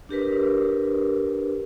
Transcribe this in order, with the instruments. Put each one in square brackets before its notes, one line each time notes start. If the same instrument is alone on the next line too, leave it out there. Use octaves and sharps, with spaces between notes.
[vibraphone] D4 G4 A#4 B4